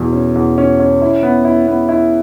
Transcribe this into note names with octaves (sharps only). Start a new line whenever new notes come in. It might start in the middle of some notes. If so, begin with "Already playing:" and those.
Already playing: E2 B2
C#4
E2
C#4
C#4
E4
B3
E4
B3
E4